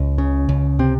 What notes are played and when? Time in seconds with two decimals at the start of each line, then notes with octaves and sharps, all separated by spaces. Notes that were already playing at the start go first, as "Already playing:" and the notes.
Already playing: C#2
0.18 C#3
0.49 C#2
0.79 C3 C4